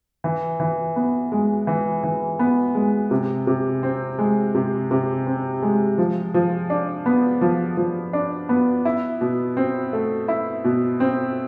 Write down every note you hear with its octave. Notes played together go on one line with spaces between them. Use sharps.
E3
E3
B3
G#3
E3
E3
B3
G#3
C3
C3
C4
G#3
C3
C3
C4
G#3
F3
F3
D4
B3
F3
F3
D4
B3
E4
B2
C4
A3
E4
B2
C4